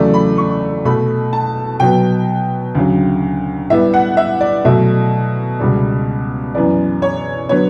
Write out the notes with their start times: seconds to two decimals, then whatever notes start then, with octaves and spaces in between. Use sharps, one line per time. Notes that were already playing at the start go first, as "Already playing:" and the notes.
Already playing: E2 C#3 F#3 A3 D5
0.14 B5
0.38 C#6
0.85 B2 A3 B5
1.33 A5
1.80 B2 F#3 B3 G5
2.75 D2 C#3 F#3
3.70 A2 G3 B3 E5
3.94 F#5
4.17 E5
4.41 D5
4.64 B2 F#3 A3 E5
5.60 C#2 B2 G3
6.55 F#2 E3 B3 D5
7.02 C#5
7.49 D3 F#3 B3 C#5